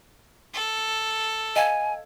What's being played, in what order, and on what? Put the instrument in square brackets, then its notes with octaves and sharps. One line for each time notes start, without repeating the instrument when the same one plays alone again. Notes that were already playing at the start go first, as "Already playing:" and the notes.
[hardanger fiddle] A4
[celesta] D#5 F5 G#6 [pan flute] G#5